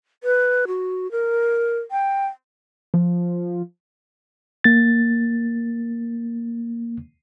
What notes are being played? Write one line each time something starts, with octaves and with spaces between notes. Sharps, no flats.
B4
F#4
A#4
G5
F3
A#3 A6